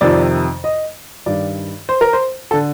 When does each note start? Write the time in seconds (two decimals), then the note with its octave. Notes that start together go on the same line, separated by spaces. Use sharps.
0.01 F2 C3 D#3 D5
0.64 D#5
1.26 G2 D#3 D5
1.89 C5
2.01 A#4
2.13 C5
2.51 A4
2.54 D3